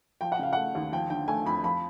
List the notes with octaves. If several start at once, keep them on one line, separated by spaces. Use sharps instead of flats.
F3 G5
F#5
C#3 F5
A3 F#5
D#2
F3 G5
D3 G5
A3 G#5
F2 B5
F3 B5